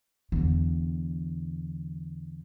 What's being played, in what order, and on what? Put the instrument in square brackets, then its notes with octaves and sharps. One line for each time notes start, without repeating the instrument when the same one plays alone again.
[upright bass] E2 D3